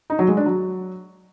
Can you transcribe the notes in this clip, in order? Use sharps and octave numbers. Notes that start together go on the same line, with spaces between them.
D#4
F#3
G#3
D4
F#3